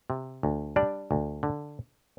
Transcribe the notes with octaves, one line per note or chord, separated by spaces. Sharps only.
C3
D2
G3 D4 D5
D2
D3